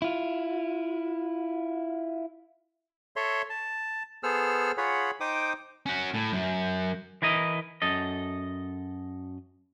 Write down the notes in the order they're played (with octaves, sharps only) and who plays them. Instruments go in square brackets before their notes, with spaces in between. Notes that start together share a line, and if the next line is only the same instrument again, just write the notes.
[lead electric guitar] E4 F4
[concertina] A4 C#5 E5 C6
A5
B3 G#4 A4 C5 E6 F6
F4 G#4 C#5 F#5 B5
D#4 C5 G5 D6 D#6
[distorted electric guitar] C#4 F#4
A2
F#2
[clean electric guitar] E3 E4 A#4 D#5
F#2 A4 D#5